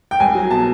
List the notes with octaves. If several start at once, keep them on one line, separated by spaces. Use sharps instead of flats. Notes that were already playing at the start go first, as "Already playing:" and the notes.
G5
C2 G#5
F#3
B2 A5